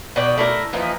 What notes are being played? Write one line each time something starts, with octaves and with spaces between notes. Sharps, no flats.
B2 D5 G5
A3 E4 A#4
E3 F3 A#3 D#4